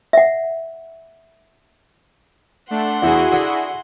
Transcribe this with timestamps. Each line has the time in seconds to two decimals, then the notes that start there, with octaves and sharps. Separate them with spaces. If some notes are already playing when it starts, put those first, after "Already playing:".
0.13 E5 F#5
2.71 A3 D4 F#5 C6
3.02 E2 E4 F#4 G#4
3.32 D3